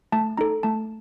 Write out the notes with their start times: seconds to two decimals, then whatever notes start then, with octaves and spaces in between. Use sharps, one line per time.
0.12 A3 A5
0.37 D#4 A4 A#5
0.63 A3 A5